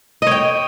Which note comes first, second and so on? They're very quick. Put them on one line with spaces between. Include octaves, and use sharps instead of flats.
D#5 C#5 G5